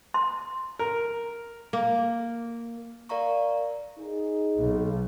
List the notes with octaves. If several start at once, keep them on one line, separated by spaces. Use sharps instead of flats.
C6
A#4
A#3
A#4 D5 F5 A#5 C#6
D#4 G#4
B1